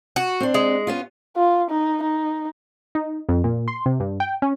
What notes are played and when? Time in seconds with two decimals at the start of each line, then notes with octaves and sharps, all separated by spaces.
0.16 F#4
0.40 C4 D4
0.54 G#3
0.87 B3 C#4 F4
1.36 F4
1.70 D#4
2.02 D#4
2.95 D#4
3.29 F2
3.44 A#2
3.68 C6
3.86 C3
4.00 G2
4.20 G5
4.42 C#4